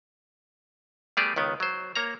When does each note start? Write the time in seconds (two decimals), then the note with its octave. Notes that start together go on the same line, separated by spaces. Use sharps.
1.17 G3 A3 B3 G4 G#4 D5
1.36 C#2 D#3 B3
1.60 F#3 C5
1.95 A#3 C#5 A#5